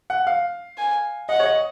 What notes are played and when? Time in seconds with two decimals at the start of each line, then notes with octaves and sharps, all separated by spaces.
0.10 F#5
0.27 F5
0.78 G#5
1.29 D#5 F#5
1.40 C#5
1.45 D#5